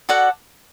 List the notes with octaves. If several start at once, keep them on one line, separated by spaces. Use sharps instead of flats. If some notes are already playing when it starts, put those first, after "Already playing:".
F#4 A4 D5 F#5